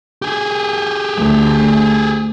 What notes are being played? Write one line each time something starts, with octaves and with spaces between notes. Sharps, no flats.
G4 G#4
D2